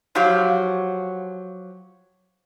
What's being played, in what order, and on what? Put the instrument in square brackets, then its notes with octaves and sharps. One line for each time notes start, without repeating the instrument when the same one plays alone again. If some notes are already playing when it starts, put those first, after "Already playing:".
[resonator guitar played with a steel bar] F3 F#3 F#4 G4 F5